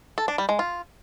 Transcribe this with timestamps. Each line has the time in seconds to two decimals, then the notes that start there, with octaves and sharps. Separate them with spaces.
0.18 A4
0.28 D4
0.38 G3
0.49 G#3
0.59 F4